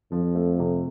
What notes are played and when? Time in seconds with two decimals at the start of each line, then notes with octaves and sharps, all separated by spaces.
0.12 F2 F3
0.35 A3
0.59 C3